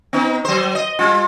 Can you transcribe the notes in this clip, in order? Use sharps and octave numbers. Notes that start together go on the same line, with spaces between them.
B3 D#4
F#3 C5
D#5
G3 F4